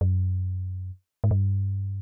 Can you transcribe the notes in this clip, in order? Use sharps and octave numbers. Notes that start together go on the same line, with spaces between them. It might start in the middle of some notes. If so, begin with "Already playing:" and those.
F#2
G#2
G2